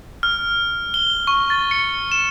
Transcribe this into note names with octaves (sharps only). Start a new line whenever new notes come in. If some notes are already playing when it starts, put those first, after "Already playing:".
F6
G7
C#6
A6
C#7
E7